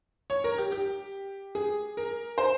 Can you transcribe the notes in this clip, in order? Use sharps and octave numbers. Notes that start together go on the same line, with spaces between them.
C#5
A#4
G4
G4
G#4
A#4
C5